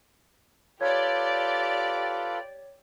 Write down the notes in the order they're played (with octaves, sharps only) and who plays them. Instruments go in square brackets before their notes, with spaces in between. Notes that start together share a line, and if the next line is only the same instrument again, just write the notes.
[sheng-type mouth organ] F4 A4 B4 [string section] G4 D5 [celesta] C#5 G#6